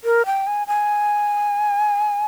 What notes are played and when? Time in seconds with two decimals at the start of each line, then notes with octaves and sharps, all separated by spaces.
0.04 A#4
0.26 G5
0.47 G#5
0.67 G#5